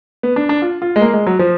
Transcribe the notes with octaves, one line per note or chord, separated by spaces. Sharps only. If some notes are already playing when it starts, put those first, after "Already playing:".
B3
D4
D4
F4
F4
G#3
A#3
G#3
F#3
F3